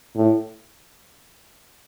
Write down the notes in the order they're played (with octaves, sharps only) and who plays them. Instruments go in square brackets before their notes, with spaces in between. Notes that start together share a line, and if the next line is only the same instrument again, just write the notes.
[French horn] A2